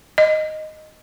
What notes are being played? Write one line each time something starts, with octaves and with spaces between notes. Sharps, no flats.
D#5